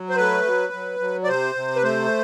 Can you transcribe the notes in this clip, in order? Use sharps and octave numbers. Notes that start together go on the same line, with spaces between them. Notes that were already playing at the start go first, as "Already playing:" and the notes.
Already playing: F#3
C5
A3 B4
F#3
F#3
F#3
D5
C3 C5
C3
B4
A3 C5